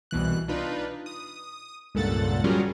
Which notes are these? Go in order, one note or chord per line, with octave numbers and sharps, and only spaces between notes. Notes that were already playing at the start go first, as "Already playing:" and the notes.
C2 B2 E3 F#6
D4 D#4 F4 B4
D#6
C#2 G2 A#2 A4 F#5 A6
F#3 G3 C#4 F4 G#4 A#4